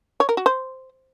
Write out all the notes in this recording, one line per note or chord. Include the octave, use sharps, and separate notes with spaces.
C#5
A#4
F#4
C5